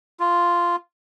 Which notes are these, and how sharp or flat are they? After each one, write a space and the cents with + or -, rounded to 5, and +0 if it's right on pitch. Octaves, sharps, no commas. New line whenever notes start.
F4 -5